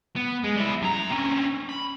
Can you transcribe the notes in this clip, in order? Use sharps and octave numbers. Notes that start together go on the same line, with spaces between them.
B3
G#3
G3 E4
F#2 A#5
C4 C#4
B5